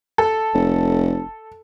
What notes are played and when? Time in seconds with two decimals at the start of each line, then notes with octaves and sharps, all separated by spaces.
0.18 A4
0.54 F1